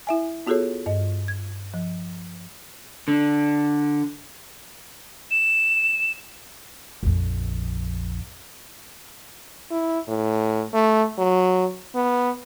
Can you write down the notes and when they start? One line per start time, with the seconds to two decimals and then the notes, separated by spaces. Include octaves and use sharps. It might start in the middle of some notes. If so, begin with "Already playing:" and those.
0.07 E4 E5 G#5
0.47 B3 F4 F#4 G#4 A4 C#5
0.86 G2 D#5
1.28 G#6
1.74 F3
3.08 D3
5.30 E7
7.03 A#1 F2
9.71 E4
10.08 A2
10.74 A3
11.18 F#3
11.95 B3